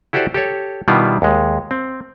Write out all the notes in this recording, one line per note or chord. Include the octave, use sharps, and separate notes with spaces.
E4 F#4 G4 A4 C5 D5
G4 A4 C#5
B2 D#3 G3 B3 E4 F4
D#2 G#3
C4